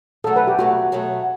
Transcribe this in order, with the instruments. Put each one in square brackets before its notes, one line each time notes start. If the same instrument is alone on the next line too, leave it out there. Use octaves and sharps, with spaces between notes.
[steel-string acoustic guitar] B2 F#3 A3 [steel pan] A4
[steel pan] B4
G4
[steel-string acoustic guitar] B2 F#3 A3 [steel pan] F#4
[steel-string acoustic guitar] B2 F#3 A3